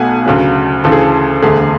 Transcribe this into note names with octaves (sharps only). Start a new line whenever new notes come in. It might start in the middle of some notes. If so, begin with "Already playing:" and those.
Already playing: B1 B2 A3 F#5 G#5
D2 C#3 F#3
D2 C#3 E3 A4
G#4
A4
E1 D2 D3 A3 G#4